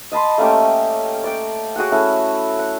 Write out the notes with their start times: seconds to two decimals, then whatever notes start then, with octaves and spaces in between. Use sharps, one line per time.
0.12 D#5 A5 B5 C6
0.38 A3 A#3 C#4 G4
1.24 D5 G5
1.76 F#4 G#4 C#5 F#5
1.92 A3 C#4 E4
2.59 F#5